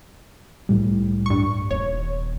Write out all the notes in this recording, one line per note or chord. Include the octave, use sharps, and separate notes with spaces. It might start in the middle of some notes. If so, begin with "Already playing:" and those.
C2 A2 G3
G2 C#6
D#1 C#5